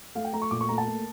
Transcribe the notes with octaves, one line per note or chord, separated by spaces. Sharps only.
A3 F5
G5
A3 A#5
C#6
A#2 D6
C#6
A3 A#5
A5
A#3